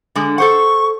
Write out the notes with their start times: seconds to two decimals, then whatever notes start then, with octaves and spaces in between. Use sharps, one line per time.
0.16 D3 G#3
0.38 A4 C5 F#5 C#6